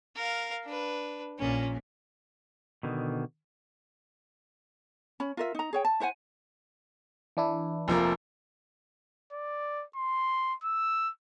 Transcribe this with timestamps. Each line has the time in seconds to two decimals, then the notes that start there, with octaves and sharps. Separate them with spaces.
0.16 A#4 F5
0.65 D4 B4
1.39 A#1 A#2 C#4
2.83 B2 D3 D#3
5.20 C#4 B5
5.37 F4 A#4 E5
5.55 D#4 A#5
5.73 G#4 C#5 G5
5.85 A5
6.00 E4 C5 F#5 G#5
7.37 E3 D4 E4
7.88 F1 F3 A#3
9.32 D5
9.95 C6
10.64 E6